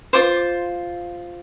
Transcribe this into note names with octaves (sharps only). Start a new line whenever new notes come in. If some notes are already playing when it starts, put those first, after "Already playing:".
F4 C5 D6